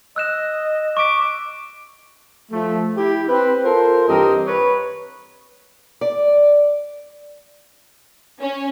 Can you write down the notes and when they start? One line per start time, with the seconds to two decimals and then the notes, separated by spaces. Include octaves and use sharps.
0.16 D#5 E6 F#6 E7
0.97 C#6 D6 B6
2.52 F3 A3
2.96 E4 G4
3.29 C4 B4
3.64 F4 A4 A#4 C5
4.08 G2 E3 C4 G4 A#4 D#5
4.47 B4 C#5
6.01 D5
8.39 C#4